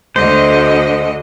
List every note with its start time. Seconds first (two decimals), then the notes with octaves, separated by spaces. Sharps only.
0.16 D2 D3 C5 D#5